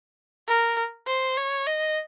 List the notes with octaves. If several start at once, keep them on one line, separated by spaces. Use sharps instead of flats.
A#4
C5
C#5
D#5